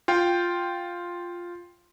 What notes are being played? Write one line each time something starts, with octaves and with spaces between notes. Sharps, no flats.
F4 G5